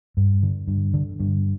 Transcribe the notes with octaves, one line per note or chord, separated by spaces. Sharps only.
G2
D3
G2
D3
G2